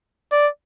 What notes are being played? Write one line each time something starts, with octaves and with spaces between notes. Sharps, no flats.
D5